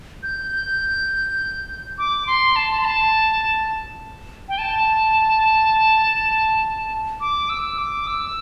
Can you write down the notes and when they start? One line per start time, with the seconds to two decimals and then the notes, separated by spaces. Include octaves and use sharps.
0.23 G6
1.98 D6
2.27 C6
2.56 A5
2.79 C6
2.85 A5
4.49 G5
4.58 A5
7.20 D6
7.49 E6
7.78 D6
8.07 E6